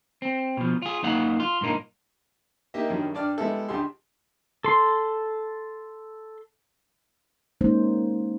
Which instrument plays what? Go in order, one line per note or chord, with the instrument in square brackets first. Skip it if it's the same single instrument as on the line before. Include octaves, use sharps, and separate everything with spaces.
[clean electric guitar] C4
B2 F3
F4 G#4
F#2 A#3 D#4 F5 F#5
F4
G2 A#2 A#3 D#4
[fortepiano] A#3 D#4 G4 D#5 E5
F#2 D#3 G3 C#4 D4
G2 D4 D5 F6
G3 G#3 B3 E4 G#4 A4
C#2 D4 G4 G#4 C6
[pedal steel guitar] A4 C6
[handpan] G#3 A#3 C#4 D#4 C5